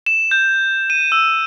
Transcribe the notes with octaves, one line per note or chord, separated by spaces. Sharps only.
E7
G6
D#7
E6